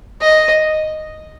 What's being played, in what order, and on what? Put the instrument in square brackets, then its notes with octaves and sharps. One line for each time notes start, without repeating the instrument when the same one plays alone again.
[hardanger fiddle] D#5